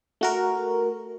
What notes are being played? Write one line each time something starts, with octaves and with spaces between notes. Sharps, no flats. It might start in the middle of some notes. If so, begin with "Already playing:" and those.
A3 F#4 A#4